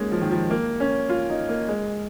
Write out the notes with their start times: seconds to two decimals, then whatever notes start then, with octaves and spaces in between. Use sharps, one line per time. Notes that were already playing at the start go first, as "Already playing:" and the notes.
Already playing: G#3 A#3 C#4 D#4
0.12 F3
0.21 D#3
0.31 F3
0.50 A#3
0.80 C#4
1.09 F4
1.30 D#4
1.49 A#3
1.68 G#3